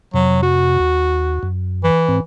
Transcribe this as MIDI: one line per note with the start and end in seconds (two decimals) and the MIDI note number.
0.14 0.78 41
0.14 0.78 48
0.14 0.42 54
0.43 1.48 66
0.79 1.39 39
1.43 1.90 42
1.84 2.19 52
2.08 2.20 44
2.08 2.20 60